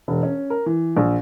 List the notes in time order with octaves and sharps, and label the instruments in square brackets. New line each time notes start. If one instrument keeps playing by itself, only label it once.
[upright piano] E1
C#4
A#4
E3
A#1